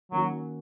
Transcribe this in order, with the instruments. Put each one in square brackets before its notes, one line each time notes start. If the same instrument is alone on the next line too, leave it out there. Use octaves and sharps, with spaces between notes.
[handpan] D#3 A#3 C#4 F#4 [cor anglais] F#3